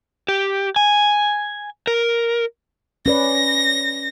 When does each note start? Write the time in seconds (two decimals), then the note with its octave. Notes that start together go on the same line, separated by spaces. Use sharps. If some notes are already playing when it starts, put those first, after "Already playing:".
0.28 G4
0.76 G#5
1.87 A#4
3.06 C#4 B4 D5 A#6